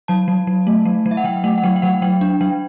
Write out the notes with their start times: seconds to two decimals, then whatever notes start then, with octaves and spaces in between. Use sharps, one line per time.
0.08 F#3 A5
0.28 F#3
0.47 F#3
0.67 A3
0.85 F#3
1.06 F#3
1.11 E5
1.17 F#5
1.24 F#3 G5
1.44 A3 F#5
1.58 F#5
1.63 F#3 G5
1.76 G5
1.82 F#3 F#5
2.02 F#3 G5
2.21 D4
2.41 F#3 G5